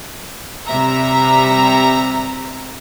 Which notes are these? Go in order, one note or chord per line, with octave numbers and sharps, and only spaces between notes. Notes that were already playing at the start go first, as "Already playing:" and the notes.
C3 G3 E5 A#5